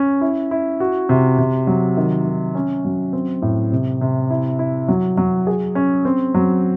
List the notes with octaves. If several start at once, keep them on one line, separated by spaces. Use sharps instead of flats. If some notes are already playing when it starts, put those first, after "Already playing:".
Already playing: C#4
E4
E4
F#4
C3
C3
F#3
D#3
D#3
C#4
F#3
C4
A2
C3
C3
E4
E4
F#3
F#3
G#4
C#4
C4
F#3